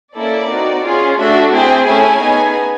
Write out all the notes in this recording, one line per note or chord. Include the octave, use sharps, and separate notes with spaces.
A#3 C#4 E4 A4 D5
C4 D#4 F#4
C#4 F4 G#4
A3 D4 F#4 A4 E5
C4 E4 G#4 G5
A3 C#4 E4 G#5
B3 D#4 G#4